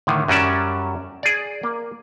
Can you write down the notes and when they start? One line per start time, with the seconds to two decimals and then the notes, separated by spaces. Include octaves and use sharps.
0.07 A2 D3 D#3
0.28 F#2 F#3 G3 C#4 D5 E5
1.23 G#4 D5
1.63 A#3